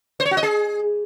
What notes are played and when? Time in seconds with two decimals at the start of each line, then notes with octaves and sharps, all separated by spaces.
0.20 C5
0.25 C#5
0.31 F#4
0.37 D#5
0.43 G#4